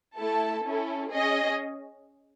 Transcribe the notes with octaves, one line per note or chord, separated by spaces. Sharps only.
A3 E4 A4 A5
C#4 E4 A4
C#4 G#4 D#5